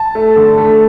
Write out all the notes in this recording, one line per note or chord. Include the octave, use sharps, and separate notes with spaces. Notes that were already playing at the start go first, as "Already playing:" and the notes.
Already playing: A5
A3
D3
A3